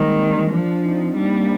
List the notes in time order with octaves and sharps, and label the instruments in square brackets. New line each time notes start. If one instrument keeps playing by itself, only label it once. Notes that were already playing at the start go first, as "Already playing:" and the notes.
Already playing: [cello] D#3 [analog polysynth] G3 G#3 A#3 C4
[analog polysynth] D4
C4
A#3 D4
[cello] F3 [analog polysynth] A#3 D4
[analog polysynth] C4 D#4
[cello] G3 [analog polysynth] A#3 D4